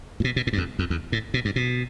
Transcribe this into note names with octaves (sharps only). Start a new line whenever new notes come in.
A2
B2
B2
A2
G2
F2
F2
E2
A2
B2
G2
B2